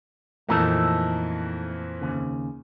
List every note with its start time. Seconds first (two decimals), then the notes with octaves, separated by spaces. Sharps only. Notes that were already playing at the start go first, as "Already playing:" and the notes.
0.49 F2 A#2 E3 A3 D#4 A4
2.02 D#2 C#3